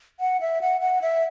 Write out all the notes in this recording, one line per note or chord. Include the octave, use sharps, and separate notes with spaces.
F#5
E5
F#5
F#5
E5